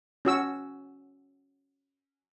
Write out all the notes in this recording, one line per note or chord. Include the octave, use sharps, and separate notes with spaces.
C#4 F#4 E6